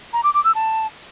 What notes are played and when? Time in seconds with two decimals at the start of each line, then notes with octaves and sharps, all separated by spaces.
0.13 A#5
0.24 D6
0.34 D6
0.44 E6
0.55 A5